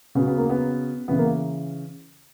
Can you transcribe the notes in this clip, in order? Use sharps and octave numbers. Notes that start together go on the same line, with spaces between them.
C#3 F#3 B3
B3
A#3
B3
C#3 E3 B3
A#3